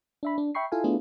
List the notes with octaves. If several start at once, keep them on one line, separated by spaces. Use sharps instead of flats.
D4 E5 B5
D4
E5 G5 B5 C#6 C7
E4 F4 A4 F5 G#5
A3 B3 D4 E4 F4 G#4